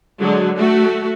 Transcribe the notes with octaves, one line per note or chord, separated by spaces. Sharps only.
D3 F#3 G#3
A3 F#4